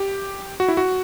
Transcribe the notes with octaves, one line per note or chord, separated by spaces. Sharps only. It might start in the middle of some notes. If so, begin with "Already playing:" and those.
Already playing: G4
F#4
E4
F#4